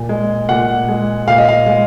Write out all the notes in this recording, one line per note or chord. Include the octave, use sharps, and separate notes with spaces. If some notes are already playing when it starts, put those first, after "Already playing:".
Already playing: A#2
G#3
A#2 F#5
G#3
A#2 F5
D#5
F5
G#3